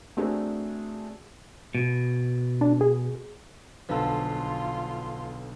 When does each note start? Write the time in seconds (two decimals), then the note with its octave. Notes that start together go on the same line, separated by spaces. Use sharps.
0.17 A3 C4 D4 F#4 G#4 A#4
1.75 B2
2.61 D4
2.81 G#4
3.89 B1 D3 F3 F4 A4 B4 C6